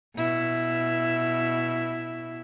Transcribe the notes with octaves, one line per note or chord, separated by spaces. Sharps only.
B2 E4